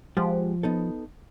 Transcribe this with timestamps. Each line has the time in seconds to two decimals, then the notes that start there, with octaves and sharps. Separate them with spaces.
0.17 F3 G#3 G4 F#5
0.63 B3 D#4 A4